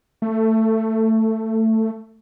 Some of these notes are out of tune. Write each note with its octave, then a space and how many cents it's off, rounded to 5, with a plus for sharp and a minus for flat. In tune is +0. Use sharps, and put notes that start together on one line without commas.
A3 +15